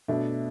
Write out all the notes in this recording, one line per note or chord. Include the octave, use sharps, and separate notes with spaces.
B2 A3 D4 E5